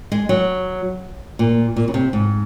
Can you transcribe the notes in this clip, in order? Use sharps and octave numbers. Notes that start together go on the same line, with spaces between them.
G#3
F#3
A#2
A#2
C#3
C3
G#2